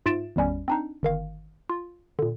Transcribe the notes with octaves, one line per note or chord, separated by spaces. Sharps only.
G#2 F4 E5 A6 D7 E7
G#1 E2 G3 C#4
C4 D4 D#4
G1 D#3 F5
F4
A#2 D3